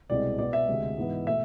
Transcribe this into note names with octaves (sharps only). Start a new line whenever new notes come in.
C2 B2 G#3 C4 D5
B2 B3 D5
E5
D2 C3 G#3
G#2 E3 B3
B2 A3 E5